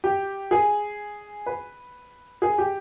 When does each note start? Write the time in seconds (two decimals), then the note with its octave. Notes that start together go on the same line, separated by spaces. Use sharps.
0.04 G4
0.51 G#4
1.46 B4
2.42 G#4
2.58 G4